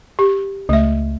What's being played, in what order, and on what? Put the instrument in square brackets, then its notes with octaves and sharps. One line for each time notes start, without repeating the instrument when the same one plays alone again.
[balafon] G4
[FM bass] C#2 [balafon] A3 E5